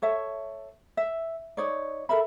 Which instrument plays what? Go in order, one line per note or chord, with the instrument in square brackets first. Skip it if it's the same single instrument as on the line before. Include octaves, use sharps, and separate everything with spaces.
[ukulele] A4 C#5 E5
E5
D#4 C#5 D5
A4 A#4 E5 B5